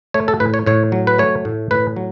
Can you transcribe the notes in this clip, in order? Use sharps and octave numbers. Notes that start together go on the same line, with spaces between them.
A3 C#5
A4
A2 B4
C#5
A2 C#5
F#3
B4
A3 C#5
A2
A2 B4
F#3